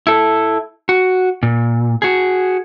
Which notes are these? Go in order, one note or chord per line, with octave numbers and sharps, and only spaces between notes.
E4 A4
F#4
A#2
F#4 G#4